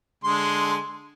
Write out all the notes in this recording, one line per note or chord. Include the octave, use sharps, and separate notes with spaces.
D3 G#3 C6